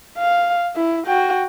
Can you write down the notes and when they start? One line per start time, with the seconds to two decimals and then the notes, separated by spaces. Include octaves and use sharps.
0.18 F5
0.76 E4
1.06 F#4 G5